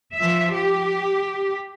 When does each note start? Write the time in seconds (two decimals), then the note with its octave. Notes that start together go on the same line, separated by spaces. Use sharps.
0.16 F3 E5
0.54 G4